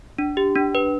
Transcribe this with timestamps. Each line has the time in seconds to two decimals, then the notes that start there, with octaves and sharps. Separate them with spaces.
0.19 D4
0.37 G4
0.55 D4
0.75 B4